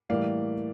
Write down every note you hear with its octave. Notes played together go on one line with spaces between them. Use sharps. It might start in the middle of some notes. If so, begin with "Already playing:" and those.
A2 E3 G3 A#3 D5 F5